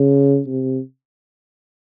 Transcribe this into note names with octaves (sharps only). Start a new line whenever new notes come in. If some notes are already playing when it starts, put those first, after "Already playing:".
Already playing: C#3
C3